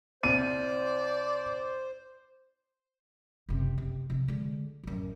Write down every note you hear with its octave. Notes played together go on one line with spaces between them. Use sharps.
C2 C5 D5 D#7
F#1 C3
C3
C3 B3
D3 G#3
A1 F#2